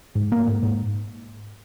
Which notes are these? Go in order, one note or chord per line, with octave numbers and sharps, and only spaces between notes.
G#2
A#3
G#2
G#2